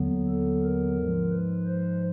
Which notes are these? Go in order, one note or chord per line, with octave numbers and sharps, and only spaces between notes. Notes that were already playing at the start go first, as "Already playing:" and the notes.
Already playing: D#2 D3 F#3 B3
A4
A#4
G#2 F3 G#3
B4
C5